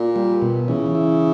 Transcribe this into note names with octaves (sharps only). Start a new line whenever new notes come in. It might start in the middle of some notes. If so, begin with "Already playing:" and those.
Already playing: A#2
G3
B2
C#3 E3
E4